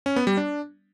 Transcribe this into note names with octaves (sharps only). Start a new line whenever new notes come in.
C#4
B3
G3
D4